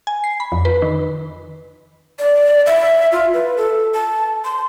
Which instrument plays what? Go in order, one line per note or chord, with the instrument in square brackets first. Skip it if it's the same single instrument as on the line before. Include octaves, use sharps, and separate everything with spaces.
[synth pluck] G#5
C7
B5
F2
B4
D#3
[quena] D5
E5
F4
B4
A4
A5
C6